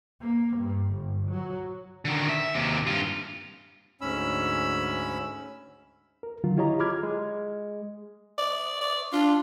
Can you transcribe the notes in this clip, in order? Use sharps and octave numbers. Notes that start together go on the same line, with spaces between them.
A#3
G2
G1
F#3
D3 D#3
E5
D#2 C3
G2 F4
D2 G#2 C#4 B5 E6
A#4
D3 D#3 F#3 F4
E4 F4 G4 C#5 D#5 A#5
G#4 B5 D6 F6 G#6
G#3
D5
D5
D4 F4